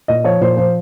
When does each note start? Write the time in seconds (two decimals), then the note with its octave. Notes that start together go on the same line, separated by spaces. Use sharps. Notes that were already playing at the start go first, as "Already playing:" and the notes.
0.08 A#2 D#5
0.24 F3 C#5
0.41 A#2 C5
0.56 F3 C5